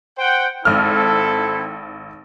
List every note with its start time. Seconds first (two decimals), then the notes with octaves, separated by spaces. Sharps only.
0.18 C5 F#5 G5
0.65 G#1 C4 E4 A4 F6